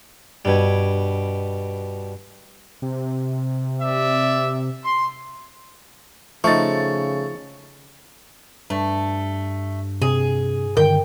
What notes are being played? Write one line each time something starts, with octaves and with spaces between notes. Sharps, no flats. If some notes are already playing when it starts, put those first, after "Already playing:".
G2 B2 G3 G#6
C3
D5 E5
C6
C#3 F3 A3 D#4 C#6 A6
G2 A3
C3 G#4
G2 D3 D#3 A#4 G5